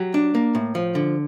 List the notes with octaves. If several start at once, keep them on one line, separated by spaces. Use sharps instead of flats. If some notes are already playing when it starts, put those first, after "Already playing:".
Already playing: F#3 G4
D4
A#3
A2
F3
D3